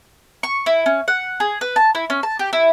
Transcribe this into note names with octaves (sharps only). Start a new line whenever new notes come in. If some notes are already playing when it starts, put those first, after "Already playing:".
C#6
E4
C#4
F#5
G#4
B4
A5
E4
C#4
A5
G4
E4